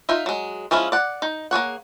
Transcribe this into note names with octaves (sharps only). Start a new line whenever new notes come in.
D#4 F4 E5
F#3 G#3
F3 G#3 C#4 E4 F4
D5 F#5
D#4
A#3 G#4 C#5 F#5